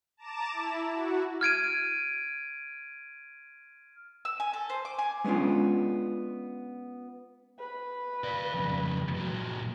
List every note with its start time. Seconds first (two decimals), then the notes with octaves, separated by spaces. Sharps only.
0.17 A5 A#5 D6 E7
0.52 E4
0.91 F#4
1.41 F6 G#6 D7 D#7
4.25 E6
4.40 G#5
4.53 A4
4.69 C5
4.85 D6
4.99 G#5
5.24 G#3 B3 C#4 D4 F4
7.59 B4
8.24 D5 F5
8.54 F2 C#3
9.16 A#2 F#3